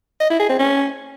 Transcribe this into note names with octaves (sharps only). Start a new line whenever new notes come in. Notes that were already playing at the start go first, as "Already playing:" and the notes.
D#5
E4
G#4
C4
C#4